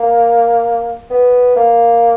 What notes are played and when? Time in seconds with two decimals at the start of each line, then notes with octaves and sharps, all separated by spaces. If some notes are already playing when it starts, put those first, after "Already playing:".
Already playing: A#3
1.10 B3
1.56 A#3